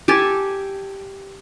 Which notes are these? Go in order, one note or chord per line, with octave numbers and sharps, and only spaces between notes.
G4 A4 G#5 A5